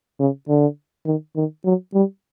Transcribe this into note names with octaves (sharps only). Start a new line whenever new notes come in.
C#3
D3
D#3
D#3
F#3
G3